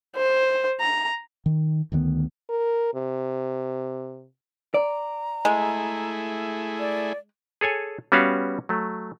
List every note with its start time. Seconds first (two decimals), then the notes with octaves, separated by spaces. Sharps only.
0.16 C5
0.81 A#5
1.46 D#3
1.92 D2 D#3 G#3 B3
2.50 A#4
2.94 C3
4.74 D5 A#5
5.45 G#3 A3 E4 G#4
6.79 D5
7.61 G#4 A4 C#5 G#5
8.12 G3 B3 C#4 F#4 B4 F5
8.69 F#3 A3